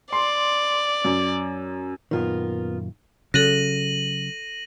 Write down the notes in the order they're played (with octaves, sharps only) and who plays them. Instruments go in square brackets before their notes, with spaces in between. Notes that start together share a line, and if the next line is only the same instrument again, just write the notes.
[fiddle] D5 [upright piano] C6
[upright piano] F#2
[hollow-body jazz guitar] F#2 A#2 D#3 [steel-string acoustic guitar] B3 F4 A#4
[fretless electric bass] C#3 F#3 [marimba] A4 F#6 [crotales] A#6 D#7 F#7